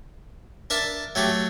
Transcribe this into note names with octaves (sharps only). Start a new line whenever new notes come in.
D4 A#4 E5 A5
F#3 A3 G4